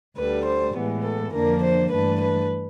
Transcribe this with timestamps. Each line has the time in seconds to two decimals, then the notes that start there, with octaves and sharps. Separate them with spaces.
0.17 D2 D3 G3 B4
0.45 C5
0.75 A2 E3 G#3 B3
1.04 A4
1.33 F2 D3 F3 A#3 D4 A#4
1.62 C5
1.90 G2 E3 A3 D4 B4
2.20 B4